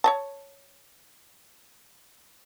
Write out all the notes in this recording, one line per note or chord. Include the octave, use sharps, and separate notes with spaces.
C#5 D#5 A5